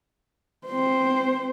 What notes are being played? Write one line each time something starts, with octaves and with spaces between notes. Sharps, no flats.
C4 C5